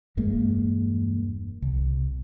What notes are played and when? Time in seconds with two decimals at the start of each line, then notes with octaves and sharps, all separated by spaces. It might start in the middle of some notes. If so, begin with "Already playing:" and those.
0.17 E1 G2 G#3 A#3
1.62 C2